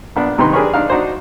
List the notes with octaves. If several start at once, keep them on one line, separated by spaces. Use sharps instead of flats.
A#1 B3 D4
G2 C3 D#3 D#4 B4 C6
D4 G4 G#4 A#4 B4 C#5
D4 D#4 F5
D4 D#4 F#4 C5